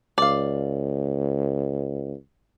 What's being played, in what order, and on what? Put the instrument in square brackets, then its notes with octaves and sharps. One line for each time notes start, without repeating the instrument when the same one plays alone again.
[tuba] C#2 [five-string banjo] D5 F5